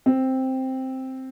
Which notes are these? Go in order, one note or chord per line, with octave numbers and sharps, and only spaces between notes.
C4